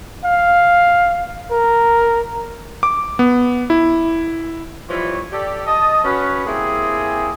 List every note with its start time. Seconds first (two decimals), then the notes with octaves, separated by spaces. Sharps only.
0.25 F5
1.51 A#4
2.83 D6
3.19 B3
3.70 E4
4.90 E3 F3 G3 E4 C#5
5.32 G4 A4 D5
5.66 D#5 A5
6.04 C#4 F#4 B4
6.46 A#3 C4 E4 G4 G#4